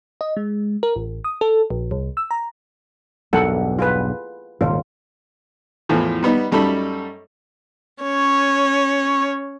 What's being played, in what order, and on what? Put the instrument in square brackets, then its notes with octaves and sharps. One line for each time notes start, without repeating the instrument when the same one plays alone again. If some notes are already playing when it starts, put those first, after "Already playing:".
[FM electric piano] D#5
G#3
A#4
A1
D#6
A4
A#1
C2
E6
A#5
[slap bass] B1 E2 G2 [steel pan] A4 A#4 F#5
[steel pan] F4 G#4 B4
[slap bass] D#1 G#1 C#3 [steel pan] F4
[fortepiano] E2 A2 E3 F3
G3 B3 D#4
F#2 G3 A3 D#4 A4 B5
[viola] C#4 C#5